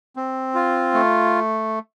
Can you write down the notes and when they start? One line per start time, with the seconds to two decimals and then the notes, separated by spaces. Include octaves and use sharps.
0.16 C4
0.55 F4
0.94 A3